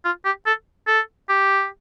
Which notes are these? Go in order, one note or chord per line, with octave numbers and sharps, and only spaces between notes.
F4
G4
A4
A4
G4